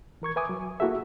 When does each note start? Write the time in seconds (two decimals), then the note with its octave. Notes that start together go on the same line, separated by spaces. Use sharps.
0.22 E3 A#4 C#6 G#6
0.36 B4 E5 G#5 D6 D#6
0.49 F#3
0.80 A#3 E4 F#4 G#4 A4 E5